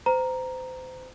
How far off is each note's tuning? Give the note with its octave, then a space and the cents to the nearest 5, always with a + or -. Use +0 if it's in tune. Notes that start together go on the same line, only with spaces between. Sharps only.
C5 -30 A#5 +0